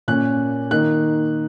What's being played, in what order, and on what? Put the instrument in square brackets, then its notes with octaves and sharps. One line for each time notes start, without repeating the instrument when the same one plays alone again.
[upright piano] A#2 A#3 C#4 F#6
D#3 A#3 D#4 F#6